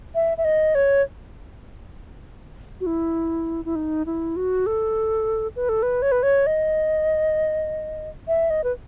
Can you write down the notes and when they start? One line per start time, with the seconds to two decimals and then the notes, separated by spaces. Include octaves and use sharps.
0.15 E5
0.38 E5
0.45 D#5
0.75 C#5
2.81 F#4
2.86 E4
3.65 E4
3.76 D#4
4.06 E4
4.36 F#4
4.66 A4
5.56 B4
5.69 A4
5.83 B4
6.02 C#5
6.12 B4
6.23 C#5
6.47 D#5
8.28 E5
8.50 D#5
8.64 B4